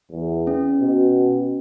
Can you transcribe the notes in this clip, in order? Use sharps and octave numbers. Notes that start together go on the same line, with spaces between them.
E2
C#4
B2